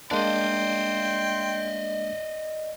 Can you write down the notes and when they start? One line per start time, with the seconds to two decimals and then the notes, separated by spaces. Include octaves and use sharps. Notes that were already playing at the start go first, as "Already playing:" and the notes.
0.11 G#3 A#3 D4 D5 D#5 G5 C6